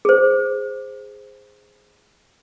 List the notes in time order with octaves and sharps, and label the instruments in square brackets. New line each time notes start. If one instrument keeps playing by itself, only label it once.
[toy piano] G#4 C5